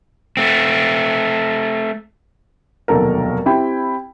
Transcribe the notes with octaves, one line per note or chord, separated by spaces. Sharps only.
A3 C4
F1 D#2 B2 F#3 A4 A#4
C4 E4 G4 G5 B5